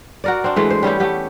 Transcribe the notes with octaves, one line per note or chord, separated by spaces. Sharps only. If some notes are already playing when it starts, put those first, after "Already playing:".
F#4 A#4 D5
C4 D4
E3 G#3 A3
C5
G3 C#4 E4 G4
A3 B3 G4